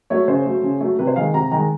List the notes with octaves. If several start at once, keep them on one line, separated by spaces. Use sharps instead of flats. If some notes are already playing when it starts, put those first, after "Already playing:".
F#3 A3 C#5
C#3 C5
F#3 A3
C#3
F#3 A3
C3 B4
C5
D#3 G#3 F5
C3 A#5
D#3 G#3 A#5